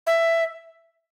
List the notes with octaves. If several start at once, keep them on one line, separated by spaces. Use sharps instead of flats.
E5